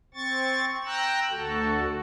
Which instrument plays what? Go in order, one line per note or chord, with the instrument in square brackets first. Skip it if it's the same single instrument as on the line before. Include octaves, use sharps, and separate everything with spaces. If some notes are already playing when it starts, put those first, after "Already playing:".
[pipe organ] C4 C#6 A6
G5 A#5 E6 F#6
D2 F#4 A4